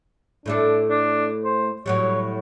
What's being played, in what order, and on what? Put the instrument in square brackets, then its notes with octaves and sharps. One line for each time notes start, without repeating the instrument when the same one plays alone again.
[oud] A2 A3 A4 [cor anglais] D4
[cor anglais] D4
C5
[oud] A2 F#3 G3 [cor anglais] C#5